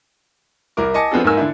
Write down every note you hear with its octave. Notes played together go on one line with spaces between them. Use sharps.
C2 E4 A#4 D6
D#5 G#5 A5 D6 C#7
F3 B3 C4 D4 G#4 A4
G#2 A#3 D#4 A#4 G#5 E6
D3 D4 E4